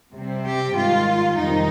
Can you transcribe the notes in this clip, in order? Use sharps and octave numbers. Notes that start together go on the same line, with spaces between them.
C3 G3 C4
G4
G#2 D#3 G3 F4
F2 C3 D#3 G3 D#4